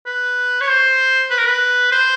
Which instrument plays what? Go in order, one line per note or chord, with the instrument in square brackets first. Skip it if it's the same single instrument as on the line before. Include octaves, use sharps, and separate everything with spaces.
[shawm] B4
C#5
C5
B4
A#4
B4
C5